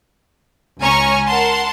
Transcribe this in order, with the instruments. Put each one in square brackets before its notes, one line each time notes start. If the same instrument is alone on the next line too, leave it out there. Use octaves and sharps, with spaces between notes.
[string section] C#2 C#4 G#5 A#5 C#6 F6
A#4 F#5 A5 C6